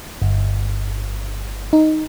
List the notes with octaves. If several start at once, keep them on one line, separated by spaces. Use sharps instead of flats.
G1
D#4